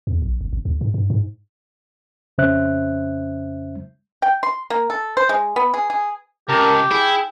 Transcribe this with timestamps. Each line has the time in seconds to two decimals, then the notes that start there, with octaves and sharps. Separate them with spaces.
0.07 E2
0.22 A#1
0.41 F#1
0.53 G1
0.65 D2
0.81 G#2
0.94 G2
1.10 G#2
2.38 F2 C#3 C#4 C5 E5 F#6
4.22 G5
4.43 C6
4.70 A#3
4.90 A4
5.17 C5
5.29 G#3
5.56 B3
5.74 G#4
5.90 G#4
6.49 C#2 G4 A#4 A5 A#5
6.91 E4 G#4 G5